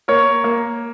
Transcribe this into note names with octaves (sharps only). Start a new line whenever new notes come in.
A#3 A#4 C#5
A#3